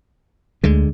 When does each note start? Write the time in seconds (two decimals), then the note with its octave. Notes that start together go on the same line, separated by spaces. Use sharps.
0.64 D2 D3 G#3